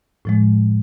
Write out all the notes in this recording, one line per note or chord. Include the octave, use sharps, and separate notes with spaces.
A2 F3 G#3